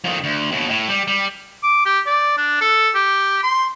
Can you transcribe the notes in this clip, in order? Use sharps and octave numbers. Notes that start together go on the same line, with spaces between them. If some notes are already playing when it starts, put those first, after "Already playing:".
F2 D#3
D2
D#2 B2
A2
G3
G3
D6
G4
D5
D4
A4
G4
C6